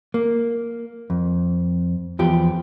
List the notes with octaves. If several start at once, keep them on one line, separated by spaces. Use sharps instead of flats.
A#3
F2
E2 F3 G4